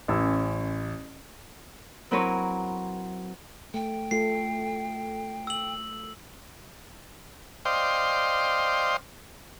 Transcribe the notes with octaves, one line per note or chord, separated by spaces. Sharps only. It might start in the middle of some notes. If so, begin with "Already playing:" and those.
A1 C#4 E6
F#3 C4 E4 A#4 B4 C#5
A3 G5
A3 F4 A4 C7
E6 F#7
C5 D5 D#5 F5 G5 C6